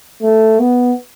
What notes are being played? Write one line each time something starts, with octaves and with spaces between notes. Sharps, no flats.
A3
B3